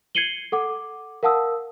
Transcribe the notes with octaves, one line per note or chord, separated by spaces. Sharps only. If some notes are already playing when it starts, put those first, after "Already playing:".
G#6 C7 C#7 D#7 F#7 G7
A4 F#5 D6
A#4 F5 F#5 A5 D#6 E6